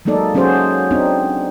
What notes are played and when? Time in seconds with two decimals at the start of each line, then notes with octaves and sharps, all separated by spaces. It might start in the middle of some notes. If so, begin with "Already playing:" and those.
0.05 F#3 G#3 A#3 D#4 A4 D5
0.35 F#3 C#4 F#4 G#4 C5
0.91 C4 D4 D#4